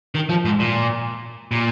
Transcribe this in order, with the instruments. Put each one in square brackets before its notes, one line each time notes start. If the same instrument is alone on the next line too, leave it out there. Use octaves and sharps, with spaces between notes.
[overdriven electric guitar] D#3
F3
G#2
A#2
A#2